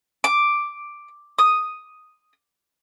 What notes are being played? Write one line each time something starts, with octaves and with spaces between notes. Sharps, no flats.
D6
D#6